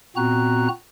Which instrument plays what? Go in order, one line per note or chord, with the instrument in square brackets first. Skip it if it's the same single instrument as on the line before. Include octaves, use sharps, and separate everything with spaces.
[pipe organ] A#2 B3 C4 F#4 A#5 F#6